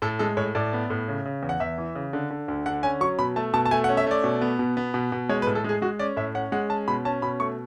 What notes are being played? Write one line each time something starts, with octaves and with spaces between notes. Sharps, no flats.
A2 A4
G#3 A4
A2 C#5
A2 D5
B3
A2
C#3
C#3
E2
F#5
E2 E5
E3
C#3
D3
D3
D2
D3 F#5
C#4 G#5
F#3 C#6
B2 B5
A3 A5
B2 A5
A5
A3 G#5
F#5
C#4
E5
A3 D5
B2
B3
B2
B3
B2
B2
G#3 C#5
B4
A2
A4
G#3 G#4
G#3 F#4
C#4 D5
A2 E5
C#4 F#5
G#3 F#5
C#4 A5
B2 B5
C#4 A5
B2 B5
A3 C#6